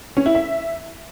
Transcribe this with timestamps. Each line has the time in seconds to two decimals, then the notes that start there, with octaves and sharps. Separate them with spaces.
0.17 C#4
0.26 E4
0.35 E5